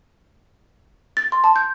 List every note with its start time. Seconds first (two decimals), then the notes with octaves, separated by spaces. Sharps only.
1.17 A6
1.32 C6
1.44 A5
1.56 G6